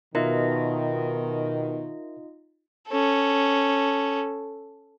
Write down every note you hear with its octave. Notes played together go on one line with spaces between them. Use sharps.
B2 D#3 D#4 F4 A#4 D#5 E5
C#4 A4